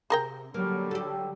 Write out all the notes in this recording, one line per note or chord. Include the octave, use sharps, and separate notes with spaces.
C3 G#4 A#4 G5
D3 F#3 G3 A#3
G4 A4